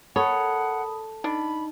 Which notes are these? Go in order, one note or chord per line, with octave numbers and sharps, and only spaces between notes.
A4 A#4 C#5 F#5 B5 D#6
D4 D#4 B5